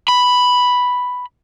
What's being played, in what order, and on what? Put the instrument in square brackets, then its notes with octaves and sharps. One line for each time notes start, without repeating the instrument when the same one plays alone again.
[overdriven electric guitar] B5